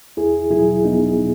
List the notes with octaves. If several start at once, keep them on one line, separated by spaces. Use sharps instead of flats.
E2 E4 G#4
B2 F#3 E4 G#4
E2 B3 D#4
B2